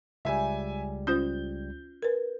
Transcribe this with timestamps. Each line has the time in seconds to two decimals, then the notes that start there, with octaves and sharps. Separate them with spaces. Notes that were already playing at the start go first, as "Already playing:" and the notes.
0.25 C#2 G3 E5 G#5
1.07 C#4 F4 C5 G6
2.02 A#4 B4